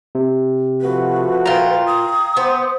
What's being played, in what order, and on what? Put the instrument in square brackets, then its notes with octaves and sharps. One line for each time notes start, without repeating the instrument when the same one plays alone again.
[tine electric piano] C3
[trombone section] F3 A3 F#4 [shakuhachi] B4
[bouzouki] A#2 F4 [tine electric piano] G5 A#5
[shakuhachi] D#6
[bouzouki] B3 [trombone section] C5